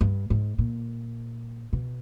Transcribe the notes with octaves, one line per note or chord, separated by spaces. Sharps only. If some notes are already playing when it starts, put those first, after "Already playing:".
G2
G#2
A#2
B2